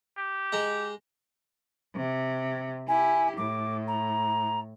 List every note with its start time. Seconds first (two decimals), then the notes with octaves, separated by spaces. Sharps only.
0.17 G4
0.52 G#3 A#5
1.96 C3
2.88 E4 G4 G#5
3.37 A2 D6
3.88 A#5